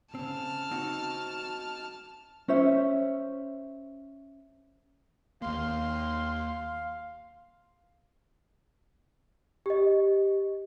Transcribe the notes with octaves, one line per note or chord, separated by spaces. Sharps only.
C#3 C4 A5 F6
C4 D#4 F#4
C#4 C5 E5
D#2 A#3 F5 C6
G4 D#5